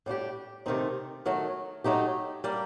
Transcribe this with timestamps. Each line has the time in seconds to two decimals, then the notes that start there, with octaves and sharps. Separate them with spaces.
0.06 A2 G3 D4 G4
0.66 C3 D#3 A3 C4 D#4
1.25 D#3 F#3 A3
1.84 F#3 A3 D#4 G4
2.44 G3 A#3 D4